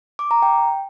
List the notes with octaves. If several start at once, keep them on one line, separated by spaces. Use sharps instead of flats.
D6
A#5
G5